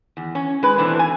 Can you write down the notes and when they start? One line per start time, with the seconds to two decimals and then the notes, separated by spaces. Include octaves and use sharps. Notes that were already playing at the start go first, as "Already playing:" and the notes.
0.17 E2
0.35 C#4
0.63 G#3 B4
0.78 B2 E3 A3 C4 D4
0.99 G#5